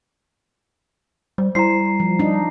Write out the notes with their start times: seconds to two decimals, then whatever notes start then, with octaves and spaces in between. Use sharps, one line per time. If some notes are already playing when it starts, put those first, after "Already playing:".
1.38 G3 C5
1.55 G3 E4 C5 A#5 C7
2.00 F3
2.19 D4 D#4